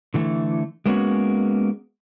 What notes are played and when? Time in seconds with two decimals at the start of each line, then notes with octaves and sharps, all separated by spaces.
0.14 D3 E3 A3
0.86 G#3 A#3 B3 C#4 E4 F#4